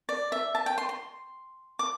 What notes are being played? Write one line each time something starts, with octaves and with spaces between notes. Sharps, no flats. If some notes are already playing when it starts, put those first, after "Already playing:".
D5
E5
A5
G5
C6
C6
D6